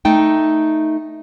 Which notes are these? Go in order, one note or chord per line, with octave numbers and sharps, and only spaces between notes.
A3 D#4 G5